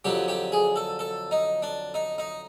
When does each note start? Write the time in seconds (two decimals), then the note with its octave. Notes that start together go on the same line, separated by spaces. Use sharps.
0.05 F2 D3 F#3 G4
0.28 G4
0.52 G#4
0.76 A4
0.99 A4
1.31 D#4
1.62 D4
1.94 D#4
2.18 D#4